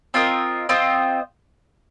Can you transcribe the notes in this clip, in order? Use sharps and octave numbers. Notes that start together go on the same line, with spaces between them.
C4 F4 A#4 D#5
C4 F4 C5 D#5